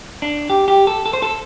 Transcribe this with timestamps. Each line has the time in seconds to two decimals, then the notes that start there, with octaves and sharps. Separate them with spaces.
0.22 D4
0.50 G4
0.68 G4
0.87 A4
1.06 A4
1.13 C5
1.22 A4